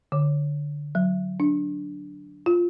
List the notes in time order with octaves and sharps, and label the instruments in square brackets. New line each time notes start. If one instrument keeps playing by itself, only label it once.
[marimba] D3
F#3
D4
F4